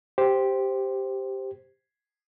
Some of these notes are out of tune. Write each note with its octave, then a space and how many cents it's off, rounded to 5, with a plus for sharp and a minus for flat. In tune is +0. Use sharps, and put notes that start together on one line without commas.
G4 +0 C5 +0